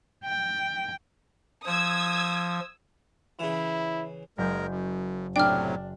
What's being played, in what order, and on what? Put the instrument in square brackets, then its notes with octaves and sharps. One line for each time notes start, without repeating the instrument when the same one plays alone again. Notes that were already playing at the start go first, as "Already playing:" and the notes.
[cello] G5
[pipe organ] F3 [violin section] D#6 E6 G#6
[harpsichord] C#3 E3 [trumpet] E4
[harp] F#1 G6 [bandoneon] G#3 A#4
[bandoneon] F#2
[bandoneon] A2 C3 F#3 [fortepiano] D4 [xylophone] G5 F6